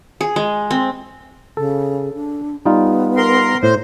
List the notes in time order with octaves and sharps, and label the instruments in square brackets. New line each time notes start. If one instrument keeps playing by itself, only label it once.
[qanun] G#4
G#3
C4
[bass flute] C#3 [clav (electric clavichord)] A4
[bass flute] D4
[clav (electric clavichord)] G3 D#4 F4 [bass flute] B3
[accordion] A#4 C6
[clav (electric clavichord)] A2 [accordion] C5